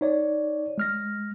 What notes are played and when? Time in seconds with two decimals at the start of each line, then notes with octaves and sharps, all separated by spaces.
0.01 D#4 C#5 D5
0.78 G#3 F6 A#6